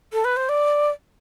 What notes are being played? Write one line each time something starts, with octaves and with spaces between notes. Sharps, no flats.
A4
B4
C5
D5